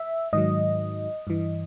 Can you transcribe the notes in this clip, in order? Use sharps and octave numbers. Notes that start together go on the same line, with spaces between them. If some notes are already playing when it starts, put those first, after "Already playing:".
Already playing: E5
G#2 D#3 F#3 D#5
G2 E3